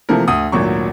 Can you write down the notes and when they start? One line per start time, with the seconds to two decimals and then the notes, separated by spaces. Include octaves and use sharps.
0.09 C3 E3 F3 A3 A#3 A#4
0.28 D2 D#6
0.52 G#1 D2 A#2 F#3 C#6